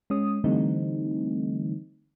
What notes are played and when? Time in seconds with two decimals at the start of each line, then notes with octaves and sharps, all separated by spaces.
0.10 G#3 C#4 D#6
0.44 D3 E3 G3 A3 C4 D#4